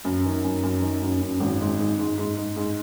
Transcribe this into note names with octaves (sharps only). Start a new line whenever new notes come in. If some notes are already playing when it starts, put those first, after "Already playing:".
F#2
D#3
F#2
F#2
D#3
F#2
F#2
G#1
G#2
G#2
G#2
G#2
G#2
G#2